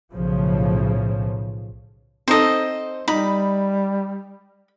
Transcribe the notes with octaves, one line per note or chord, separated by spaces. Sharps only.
B1 A2 C#3 F3
C4 D#4 A4 C5 D#5
G3 D#4 B5